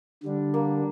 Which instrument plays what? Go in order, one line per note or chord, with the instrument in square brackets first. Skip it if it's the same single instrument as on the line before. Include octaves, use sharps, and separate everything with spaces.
[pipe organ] D3 G3 D4
[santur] A#3